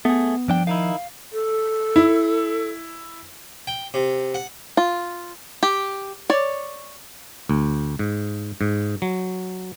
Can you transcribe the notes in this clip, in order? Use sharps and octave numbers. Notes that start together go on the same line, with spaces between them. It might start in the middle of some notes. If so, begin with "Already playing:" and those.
A3 B3 G#4
G2 F3 D4 G5
D#3 D#4 E4 F5
A4
E4
G5
C3
F#5
F4
G4
C#5 D5
D2
G#2
G#2
F#3